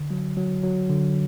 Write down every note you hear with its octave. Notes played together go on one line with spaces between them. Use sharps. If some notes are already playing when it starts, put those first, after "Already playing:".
Already playing: D3
F#3
F#3
F#3
D3